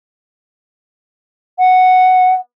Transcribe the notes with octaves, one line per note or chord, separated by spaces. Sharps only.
F#5